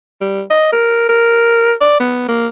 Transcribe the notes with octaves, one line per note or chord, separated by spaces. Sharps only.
G3
D#5
A#4
A#4
D5
B3
A#3